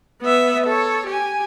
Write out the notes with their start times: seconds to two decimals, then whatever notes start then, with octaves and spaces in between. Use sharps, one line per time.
0.22 B3 E5
0.66 A4 C#5
1.06 G4 G#5